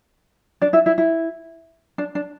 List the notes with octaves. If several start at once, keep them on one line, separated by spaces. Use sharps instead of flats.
D4 D5
E4 E5
E4 E5
E4
D4
D4